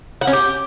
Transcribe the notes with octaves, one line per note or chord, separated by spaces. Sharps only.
F#5
C#4
G4